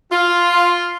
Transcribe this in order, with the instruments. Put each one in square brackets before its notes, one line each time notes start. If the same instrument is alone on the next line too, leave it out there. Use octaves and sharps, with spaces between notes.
[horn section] F4